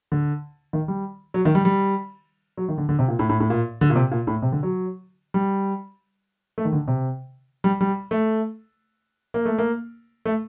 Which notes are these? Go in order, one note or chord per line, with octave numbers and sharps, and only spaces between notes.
D3
D#3
G3
F#3
D#3
G3
G3
F#3
D#3
D3
D3
C3
A#2
A2
A2
A2
A#2
D3
A#2
C3
A#2
A2
C3
D3
F#3
G3
A3
D#3
D3
C3
G3
G3
A3
A#3
A3
A#3
A3